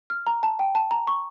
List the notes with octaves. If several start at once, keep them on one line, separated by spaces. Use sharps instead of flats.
F6
A#5
A5
G5
A5
A#5
C#6